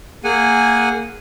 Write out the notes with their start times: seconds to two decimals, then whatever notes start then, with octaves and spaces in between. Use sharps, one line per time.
0.24 A#3 G#4 F#5 G#5